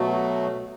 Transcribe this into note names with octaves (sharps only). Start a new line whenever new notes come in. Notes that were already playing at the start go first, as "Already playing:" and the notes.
Already playing: B2 F#3 A3